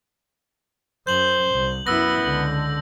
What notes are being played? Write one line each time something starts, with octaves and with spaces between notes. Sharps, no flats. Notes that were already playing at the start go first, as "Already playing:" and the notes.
F#2 C5 G6 F#7
C2
F#2 B3 E4 E6 A#6
C#2 D3